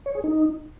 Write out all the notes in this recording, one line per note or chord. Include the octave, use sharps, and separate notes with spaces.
C#5
G#4
D#4